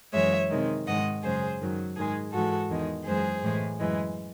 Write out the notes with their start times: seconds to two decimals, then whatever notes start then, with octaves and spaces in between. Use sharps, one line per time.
0.13 F#2 E3 G#3 C#5 E5
0.50 C3 D#3 G#3
0.87 G#2 D#3 G#3 D#5 F#5
1.23 F#2 C#3 G#3 G#4 C5
1.60 F#2 D#3 F#3
1.97 G#2 D#3 G#3 G#4
2.33 G#2 E3 G#3 F#4 A4
2.70 E2 D#3 G#3
3.06 F#2 E3 G#3 G#4 C5
3.43 A2 E3 G#3
3.80 F#2 E3 G#3